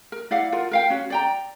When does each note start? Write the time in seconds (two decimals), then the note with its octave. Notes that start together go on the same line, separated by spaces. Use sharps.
0.12 A#4
0.31 E4 D5 F5 F#5
0.52 F4 A#4 F#5
0.71 A#4 F5 G5
0.90 C#4 F#4
1.10 D5 G5 A#5